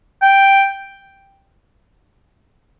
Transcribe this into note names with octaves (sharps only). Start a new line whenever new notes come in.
G5